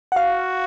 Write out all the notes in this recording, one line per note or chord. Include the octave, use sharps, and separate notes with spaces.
F#5
F#4 F5